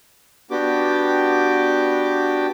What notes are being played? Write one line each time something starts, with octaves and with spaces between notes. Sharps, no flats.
B3 D4 F#4 G4 G5 D6